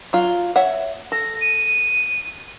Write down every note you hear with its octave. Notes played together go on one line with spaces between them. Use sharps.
F#3 F4
C#5 E5 F#5
A4 A#6
D#7